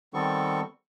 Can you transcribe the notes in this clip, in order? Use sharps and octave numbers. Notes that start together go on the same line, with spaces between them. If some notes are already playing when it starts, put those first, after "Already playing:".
D#3 G3 B3 C4 A4 C#6